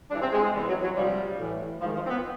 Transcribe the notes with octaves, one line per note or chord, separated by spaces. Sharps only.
G2 E3 D4
C4
G#3
G#3
E2 C3 E3 G3
F#3
F#3
D2 C3 F3 G3
A2 E3
G#2 D#3 F3
F3
C4
B3